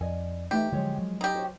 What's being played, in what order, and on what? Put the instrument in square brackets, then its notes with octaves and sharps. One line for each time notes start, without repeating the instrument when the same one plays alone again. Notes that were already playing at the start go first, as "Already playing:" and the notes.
[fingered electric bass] F2 [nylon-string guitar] D5 D#5 G#5
[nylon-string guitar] E3 A3 D#4 [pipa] G4
[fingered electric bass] D3 F#3 [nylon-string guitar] F3 G#3 C#5
[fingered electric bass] F#3
[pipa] D#4 G4
[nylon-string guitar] F#4 C5 C#5